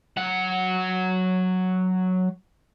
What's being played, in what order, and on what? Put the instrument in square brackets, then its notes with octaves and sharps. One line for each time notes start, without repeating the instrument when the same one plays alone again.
[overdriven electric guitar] F#3 F#5